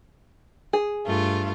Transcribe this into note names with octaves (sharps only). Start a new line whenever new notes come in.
G#4
G2 A3 F4